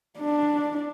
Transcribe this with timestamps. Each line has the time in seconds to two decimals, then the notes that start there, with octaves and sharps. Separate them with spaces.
0.19 D4